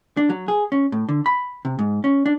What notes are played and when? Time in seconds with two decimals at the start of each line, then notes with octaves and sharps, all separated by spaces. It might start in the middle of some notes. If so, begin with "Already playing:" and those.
0.17 D4
0.30 F#3
0.48 G#4
0.72 C#4
0.92 A2
1.09 D3
1.26 B5
1.65 C3
1.79 G#2
2.04 C#4
2.26 D4